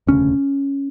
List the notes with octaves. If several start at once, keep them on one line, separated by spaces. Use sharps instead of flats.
E1 D2 C#3 C#4